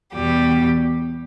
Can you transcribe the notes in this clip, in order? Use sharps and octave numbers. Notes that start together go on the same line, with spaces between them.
E2 B2 G3 G4